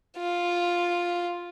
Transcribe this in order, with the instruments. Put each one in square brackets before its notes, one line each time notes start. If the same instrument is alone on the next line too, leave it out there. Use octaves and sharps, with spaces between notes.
[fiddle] F4